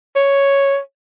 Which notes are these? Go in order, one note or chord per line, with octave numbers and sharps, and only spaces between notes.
C#5